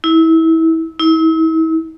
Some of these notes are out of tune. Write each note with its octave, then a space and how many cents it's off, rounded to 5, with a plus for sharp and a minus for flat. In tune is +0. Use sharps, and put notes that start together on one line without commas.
E4 -25
E4 -40